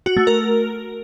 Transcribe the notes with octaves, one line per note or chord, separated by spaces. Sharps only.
F#4
A3
A#4